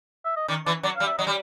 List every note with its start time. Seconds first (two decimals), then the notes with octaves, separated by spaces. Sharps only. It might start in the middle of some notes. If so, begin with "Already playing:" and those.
0.25 E5
0.36 D#5
0.48 D#3 D5
0.66 E3 D5
0.83 F#3 D5
0.96 G3 F5
1.07 E5
1.18 F#3 D#5
1.27 G3